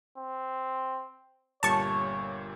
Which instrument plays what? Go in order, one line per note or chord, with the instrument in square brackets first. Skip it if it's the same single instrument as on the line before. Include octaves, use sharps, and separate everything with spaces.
[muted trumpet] C4
[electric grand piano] G1 A#2 G3 [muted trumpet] C#5 [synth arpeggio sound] A5 C#6